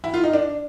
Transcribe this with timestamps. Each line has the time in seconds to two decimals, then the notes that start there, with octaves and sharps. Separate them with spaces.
0.04 E4
0.14 F4
0.24 D#4
0.33 D4